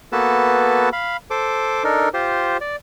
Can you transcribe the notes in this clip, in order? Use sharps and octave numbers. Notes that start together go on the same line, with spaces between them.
A#3 B3 F#4 A4 B4 A5
F5 B5
A4 C5 D6
D4 D#4 A4 A#4
F4 G4 C5
D5